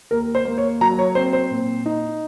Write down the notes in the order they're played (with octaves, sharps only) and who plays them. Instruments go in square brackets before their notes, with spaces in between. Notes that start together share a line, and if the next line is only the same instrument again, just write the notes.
[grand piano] D#2 A#4
C5
A#3
C#5
F#3 A#5
C#5
C4 C5
C5
A#2
D#4